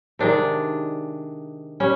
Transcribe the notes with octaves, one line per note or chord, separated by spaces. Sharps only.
C3 D#3 G#3 D4
G3 C#4